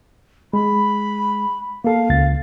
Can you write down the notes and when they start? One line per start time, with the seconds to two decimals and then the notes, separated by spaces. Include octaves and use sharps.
0.53 G#3 B5
1.84 A#3 A4 F5
2.10 C#2 A6